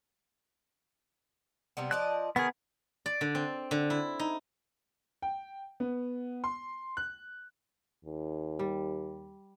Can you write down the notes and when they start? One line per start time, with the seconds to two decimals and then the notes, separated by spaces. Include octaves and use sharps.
1.77 C3 G3 B3
1.91 F3 D5 D#5 F#6
2.36 D#3 B3 G#4 A#4
3.06 D5
3.21 D3
3.35 C4
3.71 D3
3.90 E4
4.19 D#4
5.22 G5
5.80 B3
6.44 C6
6.97 F#6
8.05 D#2
8.59 G3